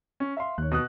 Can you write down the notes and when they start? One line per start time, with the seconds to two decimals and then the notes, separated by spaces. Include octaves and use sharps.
0.20 C#4
0.37 E5 F5 C6
0.58 D#2 C#5 F#6
0.71 B2 D#6 F#6